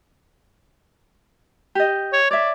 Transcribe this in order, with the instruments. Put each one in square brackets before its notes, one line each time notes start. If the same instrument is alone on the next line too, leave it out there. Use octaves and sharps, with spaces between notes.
[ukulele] G4 D#5
[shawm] C#5
[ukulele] C#5 E5 [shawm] D5